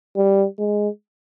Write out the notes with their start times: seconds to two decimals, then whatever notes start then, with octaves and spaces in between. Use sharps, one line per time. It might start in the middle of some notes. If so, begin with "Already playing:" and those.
0.17 G3
0.59 G#3